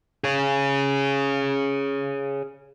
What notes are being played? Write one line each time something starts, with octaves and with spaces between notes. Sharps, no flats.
G#4 C#5